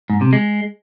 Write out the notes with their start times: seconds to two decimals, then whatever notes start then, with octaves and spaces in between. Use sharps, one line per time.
0.10 G#2
0.21 C3
0.33 G#3